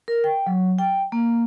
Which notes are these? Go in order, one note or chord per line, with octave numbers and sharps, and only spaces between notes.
A#4
G5
F#3
G5
A#3